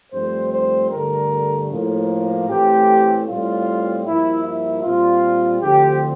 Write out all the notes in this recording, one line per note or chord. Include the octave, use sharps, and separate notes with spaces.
G2 F3 A3 C4 C5
C5
G2 D3 A3 A#4
A2 F3 A#3
A2 E3 A3 C4 G4
A2 G3 C4 F4
G2 F3 A#3 E4
E4
A#2 G3 C4 F4
D2 D3 F3 C4 G4